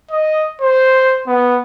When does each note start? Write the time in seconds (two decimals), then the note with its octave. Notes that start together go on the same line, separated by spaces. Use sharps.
0.11 D#5
0.61 C5
1.27 B3